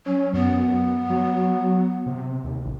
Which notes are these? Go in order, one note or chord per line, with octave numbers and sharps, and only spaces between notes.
F#3 C#4
F#2 B3
F#3
C3
D#2
A1